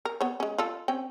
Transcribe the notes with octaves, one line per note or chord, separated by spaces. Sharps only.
A#4
B3 C#5
G#3 C#4
F4 A4
C4 C#4 G5